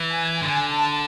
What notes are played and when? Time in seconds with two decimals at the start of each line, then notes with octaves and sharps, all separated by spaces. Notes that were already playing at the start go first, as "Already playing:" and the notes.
Already playing: E3
0.11 G#5
0.41 D3 G#5
0.71 A5